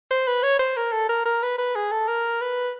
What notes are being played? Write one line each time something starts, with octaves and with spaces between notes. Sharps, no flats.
C5
B4
C#5
C5
A#4
A4
A#4
A#4
B4
B4
G#4
A4
A#4
B4